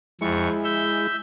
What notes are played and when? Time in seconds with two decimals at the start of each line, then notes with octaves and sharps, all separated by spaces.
0.21 F2 G#3 E4 C#6
0.64 E5 G6